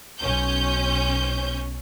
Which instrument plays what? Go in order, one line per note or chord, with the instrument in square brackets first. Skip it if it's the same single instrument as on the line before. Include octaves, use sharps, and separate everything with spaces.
[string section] B1 C#4 G6